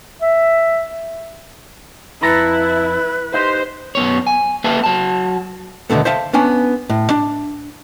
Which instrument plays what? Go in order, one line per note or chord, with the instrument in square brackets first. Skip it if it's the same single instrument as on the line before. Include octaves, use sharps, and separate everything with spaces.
[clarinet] E5
[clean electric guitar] F2 A4 A#5 [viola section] E4 [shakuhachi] B4
[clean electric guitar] D#4 G4 [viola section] C5
[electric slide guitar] F#2 B3 C#5
G#5
A#3 B4 E5 F5 G5 A5
F#3 A5
[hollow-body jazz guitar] D#2 B2 D3 A3 B3
C5 E5 F5 A5
B3 C#4 D4 G#5
A2
D4